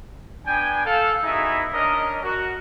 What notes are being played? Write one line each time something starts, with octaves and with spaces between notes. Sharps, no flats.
B3 D4 G5 G#5
A4 F5
B3 D#4 E4 F#4 G#4 E5
C#4 D4 A#4 D#5
F#4 A#4